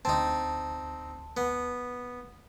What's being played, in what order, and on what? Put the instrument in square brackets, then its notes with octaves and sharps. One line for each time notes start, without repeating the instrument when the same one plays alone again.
[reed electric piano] D2 A5 [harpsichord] C4 D#4
[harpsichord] B3